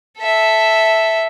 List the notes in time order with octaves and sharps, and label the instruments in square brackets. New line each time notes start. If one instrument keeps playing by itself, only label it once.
[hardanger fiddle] A4 E5